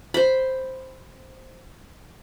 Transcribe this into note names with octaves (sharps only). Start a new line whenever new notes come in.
C5 B5